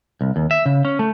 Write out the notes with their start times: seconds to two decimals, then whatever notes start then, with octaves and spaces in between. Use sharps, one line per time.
0.21 C2
0.36 D#2
0.51 E5
0.66 C#3
0.85 C#4
0.99 A3